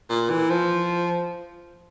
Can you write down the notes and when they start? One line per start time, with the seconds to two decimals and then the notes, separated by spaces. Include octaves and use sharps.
0.10 A#2
0.30 E3
0.50 F3